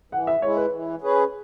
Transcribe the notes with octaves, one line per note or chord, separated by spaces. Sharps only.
E3 F#5
E5
G#3 E4 C#5
B4
E3
C#4 G#4 B4